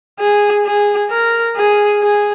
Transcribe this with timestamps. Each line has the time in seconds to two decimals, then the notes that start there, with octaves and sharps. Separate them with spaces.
0.20 G#4
0.65 G#4
1.11 A#4
1.57 G#4
2.02 G#4